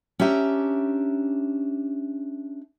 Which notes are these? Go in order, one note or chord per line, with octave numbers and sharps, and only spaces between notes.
C#4 D4 G4 E5 A#5